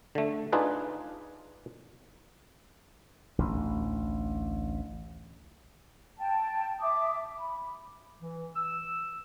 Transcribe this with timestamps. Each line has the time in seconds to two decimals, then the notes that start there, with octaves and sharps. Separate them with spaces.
0.15 D3 A3
0.52 D4 D#4 F4 G#4 B4
3.38 A1 D2
6.18 G5 A5
6.81 E5 D6 D#6
7.39 B5
8.21 E3
8.56 E6